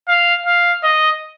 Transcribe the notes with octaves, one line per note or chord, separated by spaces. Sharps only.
F5
F5
D#5